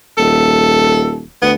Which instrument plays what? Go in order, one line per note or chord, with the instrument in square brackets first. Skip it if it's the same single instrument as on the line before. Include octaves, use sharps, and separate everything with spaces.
[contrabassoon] D#1 [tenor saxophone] A4
[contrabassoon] D2 [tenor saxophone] B3